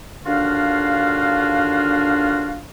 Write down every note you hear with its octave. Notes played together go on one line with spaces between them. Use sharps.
D#2 D3 D4 F4 F#4 F5